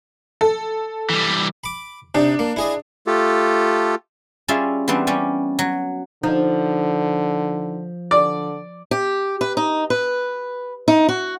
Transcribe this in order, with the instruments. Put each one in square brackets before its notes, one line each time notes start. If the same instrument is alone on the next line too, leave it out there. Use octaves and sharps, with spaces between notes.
[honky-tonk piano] A4
[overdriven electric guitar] E3 G3
[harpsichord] B5 D6
[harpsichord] C3 D#4 [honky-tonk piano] D4
[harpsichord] A#3
E4 G#4 D#5
[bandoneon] A3 F4 G4 A4
[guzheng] G3 C#4 F4 G#4 D5 E5
E3 G3 B3 C4 D4
G3 C#4 G4 D5
F#3
[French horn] D3 [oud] F3 [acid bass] D#4
[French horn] D3 [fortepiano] D5
[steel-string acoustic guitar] G4
B4
D#4
B4
D#4
F#4